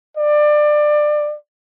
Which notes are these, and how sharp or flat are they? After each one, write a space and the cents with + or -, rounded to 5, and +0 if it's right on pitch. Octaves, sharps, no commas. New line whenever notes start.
D5 +25